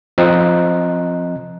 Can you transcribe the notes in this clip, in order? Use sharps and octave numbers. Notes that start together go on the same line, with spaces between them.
F3 C4 D#5 A#5 F#6